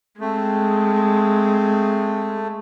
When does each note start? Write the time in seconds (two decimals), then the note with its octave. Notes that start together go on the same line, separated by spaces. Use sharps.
0.21 G#3 A3 C4